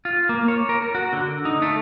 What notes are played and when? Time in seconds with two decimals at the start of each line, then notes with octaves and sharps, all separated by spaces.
0.05 F4
0.29 A#3
0.48 C#5
0.69 A#4
0.82 A#4
0.95 F#4
1.13 D3
1.45 D#4
1.62 A3